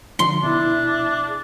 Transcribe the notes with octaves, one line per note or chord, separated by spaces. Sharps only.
D3 F3 D#4 C6
B2 D4 E4 E5
G#4